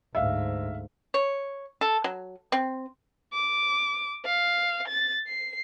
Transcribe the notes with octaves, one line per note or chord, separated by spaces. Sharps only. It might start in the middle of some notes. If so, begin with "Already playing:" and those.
D2 G#2 E5 F5
C#5
A4
F#3
C4
D6
F5
A6
C7